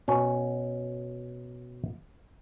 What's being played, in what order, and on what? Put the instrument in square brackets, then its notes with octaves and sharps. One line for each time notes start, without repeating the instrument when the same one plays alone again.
[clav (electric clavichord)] B2 C#4